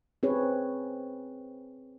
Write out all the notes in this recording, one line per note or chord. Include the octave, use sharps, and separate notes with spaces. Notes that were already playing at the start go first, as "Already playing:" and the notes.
C4 G#4 B4 C#5